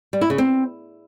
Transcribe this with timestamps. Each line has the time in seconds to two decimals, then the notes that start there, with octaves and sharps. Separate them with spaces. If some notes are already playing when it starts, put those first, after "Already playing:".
0.13 G3
0.21 E4
0.30 C#3
0.38 C4